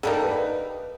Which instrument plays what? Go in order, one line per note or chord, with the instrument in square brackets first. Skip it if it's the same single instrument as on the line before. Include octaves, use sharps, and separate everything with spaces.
[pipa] D3 G3 A#3 D#4 [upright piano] A4
[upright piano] B4